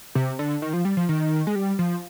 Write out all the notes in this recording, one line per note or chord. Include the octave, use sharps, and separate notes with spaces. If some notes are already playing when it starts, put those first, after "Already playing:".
C3
D3
D#3
F3
G3
F3
D#3
G#3
G3
F3